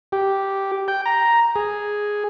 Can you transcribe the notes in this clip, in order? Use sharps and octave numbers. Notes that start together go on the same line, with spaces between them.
G4
G5
A#5
G#4